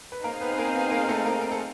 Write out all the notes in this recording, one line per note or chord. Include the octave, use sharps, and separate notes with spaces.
B4
A#3 C4 D#4 G#4 A#4 C5 F5
B3 B4
B4
A#3 A#4
B3 B4
A#3 A#4
A3 A4
A#3 A#4
A#4
A4